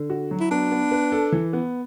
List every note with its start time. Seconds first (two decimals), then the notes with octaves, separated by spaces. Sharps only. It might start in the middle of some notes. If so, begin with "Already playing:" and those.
Already playing: D3
0.10 F#4
0.31 F#3
0.40 E4
0.51 B3 D4
0.72 B3
0.91 B4
1.12 A4
1.32 E3
1.53 B3